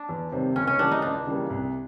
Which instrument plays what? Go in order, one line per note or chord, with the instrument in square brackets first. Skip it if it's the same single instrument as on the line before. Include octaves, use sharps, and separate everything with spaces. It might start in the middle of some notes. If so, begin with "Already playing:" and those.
Already playing: [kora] D4
[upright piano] E2
C3 D#3 G3 C4
[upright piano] C#2 [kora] C#4
[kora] C#4
[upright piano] C#3 E3 G3 A#3 [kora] D4
[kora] D#4
[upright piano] C#2 [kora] D4
[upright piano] C#3 E3 G3 A#3
C2